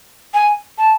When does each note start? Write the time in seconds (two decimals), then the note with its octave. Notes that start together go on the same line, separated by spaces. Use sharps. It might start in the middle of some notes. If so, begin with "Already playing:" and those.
0.34 G#5
0.78 A5